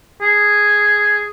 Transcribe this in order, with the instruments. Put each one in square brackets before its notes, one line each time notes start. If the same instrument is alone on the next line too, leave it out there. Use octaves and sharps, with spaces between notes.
[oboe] G#4